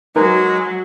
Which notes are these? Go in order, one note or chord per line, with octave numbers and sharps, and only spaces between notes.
F#3 G#3 D#4 G#4 A#4 B4